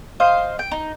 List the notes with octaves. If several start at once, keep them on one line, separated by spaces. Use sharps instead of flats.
C5 D#5 F5
G5
D#4